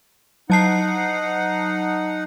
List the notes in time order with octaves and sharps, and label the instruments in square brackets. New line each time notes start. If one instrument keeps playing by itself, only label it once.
[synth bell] F#3 A5 C7 [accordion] D#4 F#5